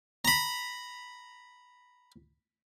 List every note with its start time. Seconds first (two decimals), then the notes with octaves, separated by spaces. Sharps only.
0.25 A#5 B5